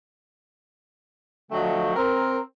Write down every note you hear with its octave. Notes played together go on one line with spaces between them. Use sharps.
D3 F3 F#3 A3 D#5 G5
C4 A#4